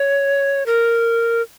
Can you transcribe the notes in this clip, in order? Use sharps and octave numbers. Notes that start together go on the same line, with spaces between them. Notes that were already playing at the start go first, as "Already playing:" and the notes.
Already playing: C#5
A#4